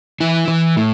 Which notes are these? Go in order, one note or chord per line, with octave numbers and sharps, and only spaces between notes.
E3 E4
E3
A2